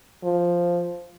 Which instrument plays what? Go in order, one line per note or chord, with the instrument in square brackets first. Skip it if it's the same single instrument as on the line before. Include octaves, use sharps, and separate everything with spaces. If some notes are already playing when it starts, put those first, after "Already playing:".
[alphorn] F3